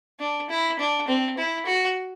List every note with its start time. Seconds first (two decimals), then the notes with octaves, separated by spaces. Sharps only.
0.20 D4
0.50 E4
0.79 D4
1.08 C4
1.38 E4
1.66 F#4